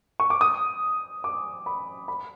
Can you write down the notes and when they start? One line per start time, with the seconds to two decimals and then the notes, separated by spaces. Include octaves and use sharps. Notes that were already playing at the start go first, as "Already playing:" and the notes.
0.20 C#6
0.30 D6
0.41 D#6
1.24 D6
1.66 B5
2.08 B5